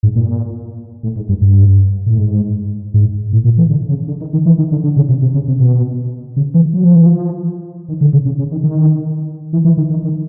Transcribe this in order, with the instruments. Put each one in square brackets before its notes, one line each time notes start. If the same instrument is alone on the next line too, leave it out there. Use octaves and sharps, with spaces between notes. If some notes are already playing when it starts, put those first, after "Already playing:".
[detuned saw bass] G#2
A#2
A2
G#2
G2
G2
A2
G#2
G#2
A2
A#2
E3
D3
C#3
D3
D#3
D#3
E3
D#3
D3
D3
C#3
C3
C3
C#3
C3
B2
C#3
E3
F#3
F3
E3
F3
D#3
D3
C#3
C#3
C#3
D#3
D#3
E3
E3
D#3
D#3
D#3